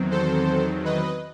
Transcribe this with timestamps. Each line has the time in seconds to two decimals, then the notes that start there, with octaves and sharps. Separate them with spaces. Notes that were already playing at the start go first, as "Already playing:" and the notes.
Already playing: E2 D#3 F#3 C4
0.11 A4 C5
0.85 B4 D#5